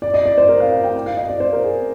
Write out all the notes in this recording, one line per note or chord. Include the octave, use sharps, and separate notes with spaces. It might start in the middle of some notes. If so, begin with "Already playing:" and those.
D5
D#5
D5
C5
A#4
F5
F5
G5
F5
D#5
D5
C5
A#4
G#4